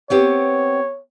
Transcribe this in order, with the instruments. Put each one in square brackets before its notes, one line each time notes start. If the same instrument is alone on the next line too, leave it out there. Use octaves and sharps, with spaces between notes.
[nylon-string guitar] B3 C4 G4 [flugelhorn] C#5